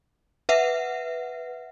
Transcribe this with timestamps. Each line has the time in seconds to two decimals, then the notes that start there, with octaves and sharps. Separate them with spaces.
0.49 B4 E5 F#5